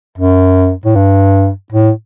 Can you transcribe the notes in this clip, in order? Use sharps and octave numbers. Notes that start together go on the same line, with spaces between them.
F#2
A2
G2
A2